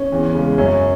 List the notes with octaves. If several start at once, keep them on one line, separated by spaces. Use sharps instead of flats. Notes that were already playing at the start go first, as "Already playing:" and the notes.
Already playing: C#4
E2
C#3 G#3
F#2 C#4